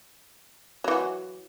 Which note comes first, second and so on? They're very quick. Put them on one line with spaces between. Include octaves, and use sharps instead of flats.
F#3 E3 F#4